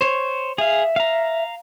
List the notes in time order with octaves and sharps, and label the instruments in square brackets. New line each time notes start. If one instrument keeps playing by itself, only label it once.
[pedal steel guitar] C5 C#5
[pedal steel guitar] G#4 F5 [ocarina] E5
[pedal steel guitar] F5 A#5